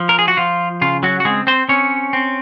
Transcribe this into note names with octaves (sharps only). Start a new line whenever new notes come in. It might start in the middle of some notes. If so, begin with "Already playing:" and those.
Already playing: F3
A#4
G#4
F#4
F3 F4
C#3 F4
F#3 F#4
F#4
G#3 C4 G#4
C4 C5
C4 C#4 C#5
C4